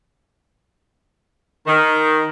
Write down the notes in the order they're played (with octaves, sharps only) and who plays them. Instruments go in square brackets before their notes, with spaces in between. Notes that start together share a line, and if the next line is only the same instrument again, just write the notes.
[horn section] D#3